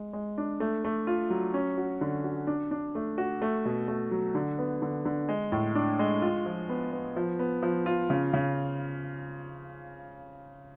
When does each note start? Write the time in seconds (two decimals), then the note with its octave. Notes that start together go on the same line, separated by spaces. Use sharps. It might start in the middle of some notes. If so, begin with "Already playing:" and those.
Already playing: G#3
0.13 G#3
0.38 D4
0.60 A3
0.84 A3
1.07 F4
1.30 F#3
1.54 C#4
1.77 F#4
2.01 D3
2.24 F#4
2.47 D4
2.71 D4
2.95 A3
3.18 F#4
3.42 A3
3.65 B2
3.88 A3
4.11 F#3
4.35 D3
4.58 B3
4.82 D3
5.05 D3
5.29 G#3
5.52 A2
5.75 D4
5.99 G#3
6.22 F4
6.46 F3
6.69 B3
6.92 B3
7.16 F3
7.39 B3
7.63 F3
7.86 F4
8.10 C#3
8.33 C#3